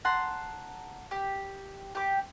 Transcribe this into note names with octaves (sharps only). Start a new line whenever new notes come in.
F#5 A5 A#5 C6
G4
G4 D6